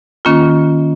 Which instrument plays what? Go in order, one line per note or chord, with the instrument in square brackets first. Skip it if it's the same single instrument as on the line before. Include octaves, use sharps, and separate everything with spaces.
[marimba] D#3 A#3 C#4 F4